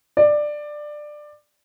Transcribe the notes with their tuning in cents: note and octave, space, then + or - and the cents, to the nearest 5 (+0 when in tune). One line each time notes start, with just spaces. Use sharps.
D5 +15